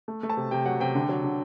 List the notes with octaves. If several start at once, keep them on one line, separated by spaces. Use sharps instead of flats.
A3
A3
A5
C3
C3 G5
F#3 F#5
C3 G5
D3
F#3
D3